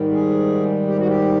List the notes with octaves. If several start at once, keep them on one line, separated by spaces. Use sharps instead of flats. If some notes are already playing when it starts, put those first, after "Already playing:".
Already playing: G#2 D#3 G3
G#4
G4
F#4
G4